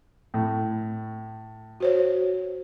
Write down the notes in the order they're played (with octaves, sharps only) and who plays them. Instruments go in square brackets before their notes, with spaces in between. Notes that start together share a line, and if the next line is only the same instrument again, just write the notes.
[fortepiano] A2
[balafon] F#4 C5 C#5